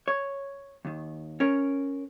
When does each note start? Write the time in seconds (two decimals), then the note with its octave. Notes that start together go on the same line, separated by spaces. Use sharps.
0.08 C#5
0.85 D#2 D#3
1.40 C#4 A#4 C#5